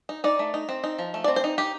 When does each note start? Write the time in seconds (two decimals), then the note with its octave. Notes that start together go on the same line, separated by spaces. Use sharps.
0.09 D#4
0.24 D#4 D5
0.39 A3
0.54 D#4
0.69 C4
0.84 D#4
0.99 F3
1.14 A3
1.24 D5
1.28 C4
1.36 C5
1.44 D#4
1.58 D#4 G4